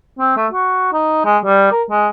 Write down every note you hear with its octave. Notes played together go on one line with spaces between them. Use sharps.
C4
A3
F#4
D#4
G#3
G3
A#4
G#3